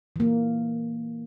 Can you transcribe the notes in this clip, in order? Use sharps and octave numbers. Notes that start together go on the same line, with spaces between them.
E3 A#3